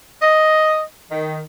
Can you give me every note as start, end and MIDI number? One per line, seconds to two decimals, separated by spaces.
0.22 0.81 75
1.10 1.40 51